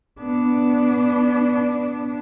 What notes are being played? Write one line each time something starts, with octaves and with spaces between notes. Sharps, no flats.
B3 D4